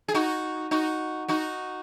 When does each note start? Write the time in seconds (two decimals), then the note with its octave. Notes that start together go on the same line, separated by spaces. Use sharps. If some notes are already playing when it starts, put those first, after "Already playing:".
0.08 G#4
0.14 D#4 F#4
0.71 D#4 F#4
1.28 D#4 F#4